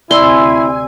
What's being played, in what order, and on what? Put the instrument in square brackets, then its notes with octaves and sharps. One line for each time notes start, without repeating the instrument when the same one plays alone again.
[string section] D2 C3 G#5 [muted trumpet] E4 [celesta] D5 E6 [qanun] C6